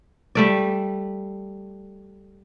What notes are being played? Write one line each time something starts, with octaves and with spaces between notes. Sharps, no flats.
G3 A3 D5